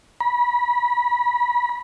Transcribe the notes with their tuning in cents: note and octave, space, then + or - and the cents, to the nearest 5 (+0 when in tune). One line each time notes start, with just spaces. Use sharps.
B5 -30